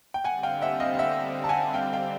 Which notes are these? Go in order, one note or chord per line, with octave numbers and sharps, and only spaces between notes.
G5
D3 G3 C4 F#5 G#5
F5 G5
E5 F#5
D#5 F5
F5
E5 F#5
A5
F#5 G#5
F5 G5
F5 G5